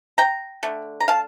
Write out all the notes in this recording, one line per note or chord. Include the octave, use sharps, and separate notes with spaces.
G5 A#5
D3 A3
A#5
F5 A5